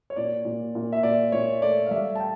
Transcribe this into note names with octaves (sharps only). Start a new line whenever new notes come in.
C#5
A#2 D5
A#2
A#2
E5
A#2 D5
A#2 C#5
A3 D5
F5
G3 E5
A5
G5